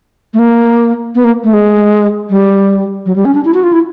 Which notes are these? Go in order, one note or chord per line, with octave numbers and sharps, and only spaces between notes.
A3
A#3
B3
A#3
A3
G#3
G3
F#3
G3
C#4
D4
E4
F#4
F4
E4